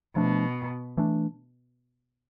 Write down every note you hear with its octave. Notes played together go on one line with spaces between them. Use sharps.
B2 F3 A3 D4
E3 A3 D4